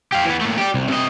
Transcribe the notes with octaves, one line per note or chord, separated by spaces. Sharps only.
G4 F5
E3 B3
A#2 A3
G4 D5
C2
C3 D#5